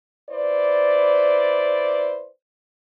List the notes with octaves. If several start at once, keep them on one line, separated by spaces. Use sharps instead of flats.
E4 B4 C5 D5